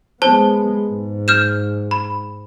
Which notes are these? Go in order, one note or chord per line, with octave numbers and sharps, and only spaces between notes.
G#3 B3 C5 A5 G7
G#2
F6 G6 E7
B5